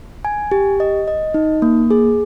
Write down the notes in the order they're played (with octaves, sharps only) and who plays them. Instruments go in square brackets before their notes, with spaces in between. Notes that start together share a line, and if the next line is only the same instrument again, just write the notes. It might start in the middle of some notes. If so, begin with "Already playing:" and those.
[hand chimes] G#5
G4
D#5
D#5
D#4
A#3
G#4